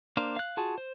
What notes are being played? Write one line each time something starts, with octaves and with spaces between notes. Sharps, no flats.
A#3 D4 C5 F5
F5 F#6
F4 F#4 G#4 A5
C5